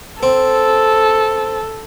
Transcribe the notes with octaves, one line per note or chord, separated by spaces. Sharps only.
C4 A4